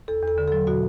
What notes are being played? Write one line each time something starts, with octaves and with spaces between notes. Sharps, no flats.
E2 A4
E2
A4
D3
F#3 A4
B2 F#4